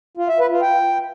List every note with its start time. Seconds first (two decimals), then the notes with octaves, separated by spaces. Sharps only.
0.17 F4
0.28 E5
0.40 B4
0.51 F4
0.62 G5